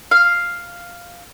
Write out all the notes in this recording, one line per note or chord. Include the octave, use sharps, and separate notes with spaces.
F5